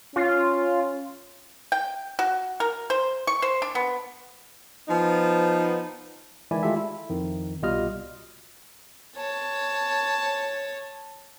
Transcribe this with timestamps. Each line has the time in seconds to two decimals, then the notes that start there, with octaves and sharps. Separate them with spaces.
0.16 C#4 F4
1.72 G5
2.19 F#4
2.60 A#4
2.90 C5
3.27 C#6
3.42 C5
3.62 D4
3.75 B3
4.88 F3 B3 D#4
6.51 D#3 E3 G#3 E4 D5 G#5
6.63 G#3 A3 F4 G4 A4 E5
6.76 E4
7.09 F2 D#3
7.62 C2 B2 G3 F4 D#5 F6
9.16 C#5 A5